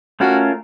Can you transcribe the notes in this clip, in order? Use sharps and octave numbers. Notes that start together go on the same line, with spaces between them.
A3 C#4 F4 F#4 A#4